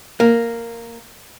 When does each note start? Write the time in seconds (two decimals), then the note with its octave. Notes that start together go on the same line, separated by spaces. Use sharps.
0.20 A#3